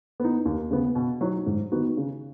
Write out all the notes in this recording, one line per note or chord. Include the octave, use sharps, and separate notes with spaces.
B3 D#4
D#2
C#3 B3
B2
F#3 D#4 F#4
G#2
D#3 B3 D#4 F#4
C#3